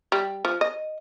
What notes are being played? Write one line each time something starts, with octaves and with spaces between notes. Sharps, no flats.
G3
F3
D#5